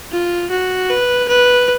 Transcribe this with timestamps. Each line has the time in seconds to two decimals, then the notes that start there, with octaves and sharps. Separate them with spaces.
0.12 F4
0.51 F#4
0.90 B4
1.29 B4